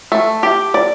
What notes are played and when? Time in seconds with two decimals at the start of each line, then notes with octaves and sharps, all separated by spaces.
0.12 A3
0.43 G4
0.74 D5